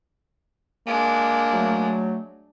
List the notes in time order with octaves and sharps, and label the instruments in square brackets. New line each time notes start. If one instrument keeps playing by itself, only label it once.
[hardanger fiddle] G#3 D4 [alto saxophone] A#3
[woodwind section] F#3 A3